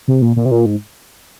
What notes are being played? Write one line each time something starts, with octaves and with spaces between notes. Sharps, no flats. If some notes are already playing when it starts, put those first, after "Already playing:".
C3
A#2
A#2
C3
A#2
G#2